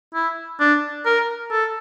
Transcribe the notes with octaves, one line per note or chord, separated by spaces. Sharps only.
E4
D4
A#4
A4